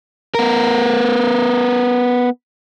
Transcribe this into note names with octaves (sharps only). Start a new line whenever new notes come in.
B3 A#4